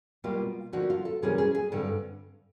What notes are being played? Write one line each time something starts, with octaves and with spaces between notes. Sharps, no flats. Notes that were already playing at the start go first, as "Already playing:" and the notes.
B2 G3 A#3 F4
D3 F3 A#3 D#4 F#4
F4
A4
C3 E3 G3 A#3 C#4 G#4
G#4
G#4
G2 D3 G3 C4 A4